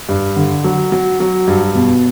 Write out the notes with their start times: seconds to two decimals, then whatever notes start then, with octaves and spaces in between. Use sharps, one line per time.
0.09 G2
0.36 D3
0.64 F#3
0.92 F#3
1.20 F#3
1.48 G2
1.75 B2